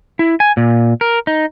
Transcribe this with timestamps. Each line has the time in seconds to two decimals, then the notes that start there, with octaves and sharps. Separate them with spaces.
0.19 E4
0.40 G#5
0.57 A#2
1.01 A#4
1.27 D#4